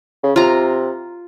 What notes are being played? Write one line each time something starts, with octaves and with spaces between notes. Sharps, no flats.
C#3
C3 F4 A#5